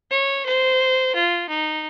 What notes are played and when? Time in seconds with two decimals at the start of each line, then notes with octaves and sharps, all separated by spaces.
0.11 C#5
0.45 C5
1.15 F4
1.49 D#4